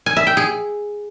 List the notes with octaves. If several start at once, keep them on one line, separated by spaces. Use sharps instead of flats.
G#5
E5
G5
G#4